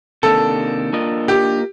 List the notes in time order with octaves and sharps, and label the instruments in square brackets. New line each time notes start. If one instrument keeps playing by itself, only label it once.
[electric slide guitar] C3 D#3 A#3 D4 [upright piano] A4
[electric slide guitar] A#3 D4 F4 A#4 D#5
[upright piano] G4